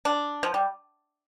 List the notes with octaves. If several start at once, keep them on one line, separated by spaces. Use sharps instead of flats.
D4
F3
G3